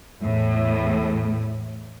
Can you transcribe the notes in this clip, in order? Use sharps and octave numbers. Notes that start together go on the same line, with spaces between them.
E2 A2